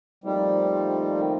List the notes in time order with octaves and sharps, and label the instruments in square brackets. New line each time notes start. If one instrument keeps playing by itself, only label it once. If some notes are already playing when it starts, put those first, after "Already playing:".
[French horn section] A#2 F3 A3 C4 D#4 [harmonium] G3
[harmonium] D#3